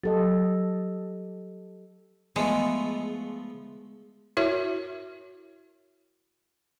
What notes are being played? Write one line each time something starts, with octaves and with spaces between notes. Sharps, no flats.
F#3 G4 A4 D#5
F3 G#3 A3 B3
E4 F#4 A#4 C#5 E5